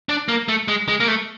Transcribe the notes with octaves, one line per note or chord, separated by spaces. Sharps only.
D4
A#3
A3
G#3
G#3
A#3
A3